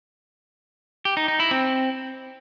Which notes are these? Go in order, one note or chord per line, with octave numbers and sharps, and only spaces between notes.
G4
D#4
D#4
E4
C4